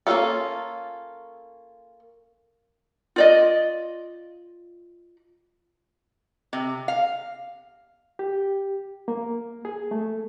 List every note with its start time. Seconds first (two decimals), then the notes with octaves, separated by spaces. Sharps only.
0.07 A#3 C#4 D#4 F4 A4
3.16 F4 D5 D#5
6.53 C3
6.88 F5
8.19 G4
9.08 A#3
9.65 G#4
9.91 A3